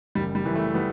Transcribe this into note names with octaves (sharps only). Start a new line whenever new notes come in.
F#1 G3
G3
F#2 E3
A3
G3 B3